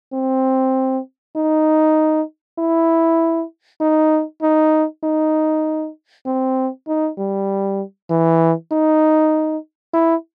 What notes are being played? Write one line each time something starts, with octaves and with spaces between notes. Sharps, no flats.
C4
D#4
E4
D#4
D#4
D#4
C4
D#4
G3
E3
D#4
E4